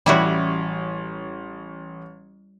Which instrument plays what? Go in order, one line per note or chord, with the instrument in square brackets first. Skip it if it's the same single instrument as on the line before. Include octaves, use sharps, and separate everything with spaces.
[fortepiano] A1 C#4 [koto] G3 E4 F#4